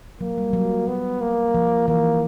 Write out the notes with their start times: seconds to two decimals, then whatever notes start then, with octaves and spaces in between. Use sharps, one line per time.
0.21 F#3 A#3
0.38 G3
0.53 F#3
0.87 F#3 B3
1.21 A#3
1.54 F3
1.88 E3 A#3